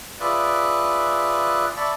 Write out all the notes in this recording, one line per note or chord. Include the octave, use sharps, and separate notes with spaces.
F4 G#4 B4 D5 E5 F#6
D5 E5 A5 B5 C#6